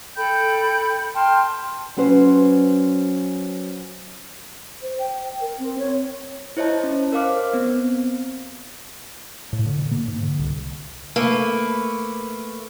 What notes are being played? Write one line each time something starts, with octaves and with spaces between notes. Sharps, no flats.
A4 G5 B5 G6
G5 A5 C6 F6
F#3 C#4 B4 C5
C5
G5
A#4
C4
C#5
E4 C5 C#5 D#5 A5
C#4
A#4 C5 F5 D6 F6
B3 C4
A2
D3
A#2
A#3
G#2
D3
C2
A3 A#3 B4